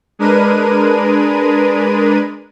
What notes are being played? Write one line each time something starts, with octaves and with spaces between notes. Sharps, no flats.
G#3 D4 A#4 B4 D#7